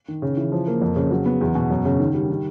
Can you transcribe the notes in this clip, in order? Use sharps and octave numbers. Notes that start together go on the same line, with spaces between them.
D#3
C#3
E3
F3
A#3
F2
C#3
F#3
B3
E2
B2
F#2
C#3
D#3
G3
D#3